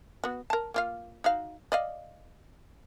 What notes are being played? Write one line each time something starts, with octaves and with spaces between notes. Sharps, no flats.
B3 F#4
A#4 A5
A#3 F4 F5
D#4 F#4 F5
D5 D#5 F5